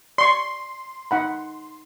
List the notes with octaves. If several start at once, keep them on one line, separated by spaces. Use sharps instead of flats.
D5 C6 C#6
D#4 F#5 B5